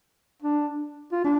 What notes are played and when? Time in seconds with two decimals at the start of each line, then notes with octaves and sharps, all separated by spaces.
0.42 D4
1.12 F4
1.24 D4